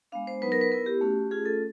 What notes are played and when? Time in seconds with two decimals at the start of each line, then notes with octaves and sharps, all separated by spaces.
0.12 G#3 B3 D4 F5
0.27 C5
0.42 F#3 B3 D#4 B4
0.52 A#4
0.61 B4
0.72 B3 E4 A#4
0.86 G4
1.01 A3 C#4 F#4
1.31 A3 C#4 F4 G#4
1.46 A4